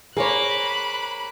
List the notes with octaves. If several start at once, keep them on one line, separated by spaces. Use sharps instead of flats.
A#3 G#4 C5 C#5 B5 F#6